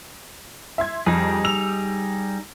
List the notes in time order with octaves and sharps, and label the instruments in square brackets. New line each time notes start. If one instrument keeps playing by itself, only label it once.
[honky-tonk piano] E5 C6 G#6
[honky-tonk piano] F2 [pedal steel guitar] G3 D#4 G#4
[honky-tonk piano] E6 F7